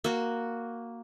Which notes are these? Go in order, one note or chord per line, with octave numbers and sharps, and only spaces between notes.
A#3 F#4